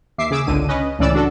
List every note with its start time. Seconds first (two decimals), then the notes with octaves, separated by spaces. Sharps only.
0.18 D#2 E5 D6 C7
0.31 C#3 G#4 D6 E6
0.46 G#1 C#2 D3 D#7
0.68 C#4 B4 D#5
0.99 C#2 A2 E3 C#4 D5 E6
1.14 D4 F#4 A4